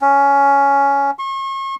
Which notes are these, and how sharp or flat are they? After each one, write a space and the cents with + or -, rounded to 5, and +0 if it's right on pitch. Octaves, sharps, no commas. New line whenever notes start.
C#4 +10
C#6 -40